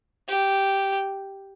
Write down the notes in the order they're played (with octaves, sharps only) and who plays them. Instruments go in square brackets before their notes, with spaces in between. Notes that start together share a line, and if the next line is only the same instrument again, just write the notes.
[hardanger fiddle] G4